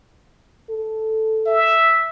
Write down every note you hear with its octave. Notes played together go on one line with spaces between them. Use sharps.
A4
E5